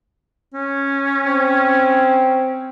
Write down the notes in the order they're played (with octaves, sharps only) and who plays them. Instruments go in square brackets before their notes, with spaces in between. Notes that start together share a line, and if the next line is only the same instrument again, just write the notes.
[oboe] C#4
[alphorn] C4